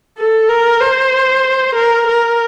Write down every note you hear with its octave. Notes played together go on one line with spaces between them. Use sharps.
A4
A#4
C5
A#4
A#4